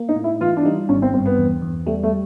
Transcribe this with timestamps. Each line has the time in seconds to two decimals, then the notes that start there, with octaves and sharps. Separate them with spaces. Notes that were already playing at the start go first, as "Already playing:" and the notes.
Already playing: A#3
0.09 D#4
0.16 A2
0.24 E4
0.41 E3 F4
0.57 D4
0.65 G3 D#4
0.89 G#1 C#4
1.02 C4
1.13 G2 C4
1.26 B3
1.38 E2
1.62 E2
1.87 G3 A3
2.03 A3